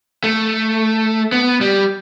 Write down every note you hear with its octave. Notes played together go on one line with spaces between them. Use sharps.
A3
B3
G3